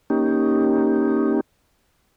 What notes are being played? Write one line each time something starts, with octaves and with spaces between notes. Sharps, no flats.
A#3 C#4 D#4 G4